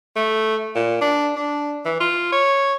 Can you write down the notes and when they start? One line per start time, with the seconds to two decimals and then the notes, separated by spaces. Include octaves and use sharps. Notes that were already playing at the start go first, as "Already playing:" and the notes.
0.16 A3
0.75 A#2
1.01 D4
1.36 D4
1.85 E3
2.00 F4
2.32 C#5